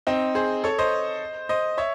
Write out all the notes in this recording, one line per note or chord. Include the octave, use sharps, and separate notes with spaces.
C4 D#4
G#4 C5
A4 C#5
C5 D#5
C5 D#5
C#5 E5